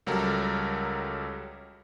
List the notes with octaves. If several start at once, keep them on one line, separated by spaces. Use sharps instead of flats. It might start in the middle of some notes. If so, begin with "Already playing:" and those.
C#2 F#3 G3 A4 A#4